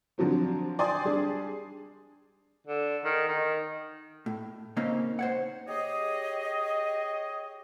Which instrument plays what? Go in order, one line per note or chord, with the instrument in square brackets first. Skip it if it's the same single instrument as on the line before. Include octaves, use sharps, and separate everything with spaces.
[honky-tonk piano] D3 F3 F#3 C4
D5 G5 G#5 C6 D#6
G3 D4 G#4
[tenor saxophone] D3
D#3
D#3
[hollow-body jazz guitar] A2
C#3 A#3 C4 C#4 D#4
C5 C#5 F#5
[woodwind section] G4 G#4 C#5 D#5